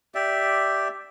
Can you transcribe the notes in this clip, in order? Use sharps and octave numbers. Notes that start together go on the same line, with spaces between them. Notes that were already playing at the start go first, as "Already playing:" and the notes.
G4 D5 E5